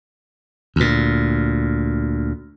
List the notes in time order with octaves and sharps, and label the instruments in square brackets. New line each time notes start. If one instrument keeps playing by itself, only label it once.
[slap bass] D2 A#2